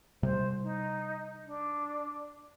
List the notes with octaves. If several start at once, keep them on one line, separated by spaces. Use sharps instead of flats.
C3 G3 C5
D#4
D4